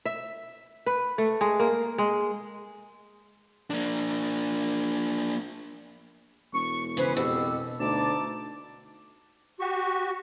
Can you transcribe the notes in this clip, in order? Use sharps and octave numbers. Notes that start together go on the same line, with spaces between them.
E5
B4
A3
G#3
A#3
G#3
A#3 D4
E1 C#6
C#3 E3 B4 C5
F2 B2 G4 E6
D2 D#4 A5 D6
F#4 G4 C#6